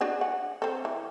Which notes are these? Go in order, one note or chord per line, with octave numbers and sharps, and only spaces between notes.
D4 F#4 G#4
F#5
C4 A4
E3